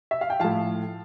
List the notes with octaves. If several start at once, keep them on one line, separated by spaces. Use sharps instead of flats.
E5
F5
G5
A2 F3 F5 A5